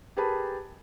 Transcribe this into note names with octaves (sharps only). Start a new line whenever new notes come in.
G4 G#4 A#4 B4 A5 B5